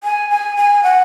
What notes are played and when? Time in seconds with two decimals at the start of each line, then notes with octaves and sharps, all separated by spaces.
0.04 G#5
0.30 G#5
0.57 G#5
0.83 F#5